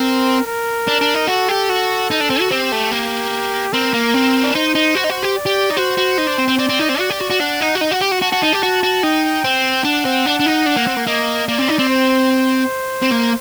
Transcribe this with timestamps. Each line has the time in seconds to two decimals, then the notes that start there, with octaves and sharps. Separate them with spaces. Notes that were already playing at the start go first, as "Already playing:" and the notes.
Already playing: C4 A#4
0.47 A#4
0.87 D4
1.01 D4
1.15 D#4
1.28 F#4 A4
1.49 G4
1.70 F#4
2.11 D#4
2.20 D4
2.30 C4
2.40 F#4
2.51 C4 G4
2.72 A3
2.91 A#3
3.73 C4 A#4
3.94 A#3
4.14 C4
4.44 D4
4.55 D#4 C5
4.75 D#4
4.95 F#4
5.04 D#4
5.10 F#4
5.23 G4
5.36 D5
5.46 G4
5.70 D#4
5.77 F#4 C5
5.98 F#4
6.18 D#4
6.27 D4
6.38 C4
6.48 C4
6.59 C4 D5
6.69 C4
6.79 D#4
6.89 C4
6.99 F#4
7.10 G4
7.20 F#4
7.30 F#4
7.40 D4 F#5
7.60 D#4
7.75 F#4
7.81 D#4
7.91 F#4
8.01 G4
8.11 F#4
8.21 F#4 A5
8.32 F#4
8.42 D#4
8.53 G4
8.63 F#4
8.83 F#4
9.03 D#4 G5
9.44 C4
9.85 D4 F#5
10.05 C4
10.26 D4
10.40 D4
10.46 D#4
10.66 D4
10.77 A#3
10.87 C4
10.97 A#3
11.07 A#3 D#5
11.48 A#3 D5
11.59 C4
11.68 D#4
11.79 C4
11.89 C5
13.03 C4
13.11 A#3